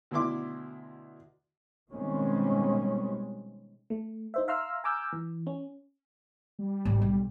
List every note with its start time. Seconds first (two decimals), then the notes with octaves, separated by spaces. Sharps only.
0.11 D2 B2 E4 C6 D6
1.91 B2 D#3 G3 G#3 C4 C#4
3.90 A3
4.34 D#4 C5 E5
4.48 E5 F5 A#5 C6 E6 F6
4.84 G#5 A#5 D6 E6 F6 G6
5.13 E3
5.47 C#4
6.59 G3
6.85 G#1
7.02 B1